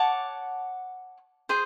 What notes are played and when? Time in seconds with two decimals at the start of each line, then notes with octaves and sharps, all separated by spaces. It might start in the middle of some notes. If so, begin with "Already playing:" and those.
Already playing: C#5 F#5 A5 D6
1.49 G#4 C5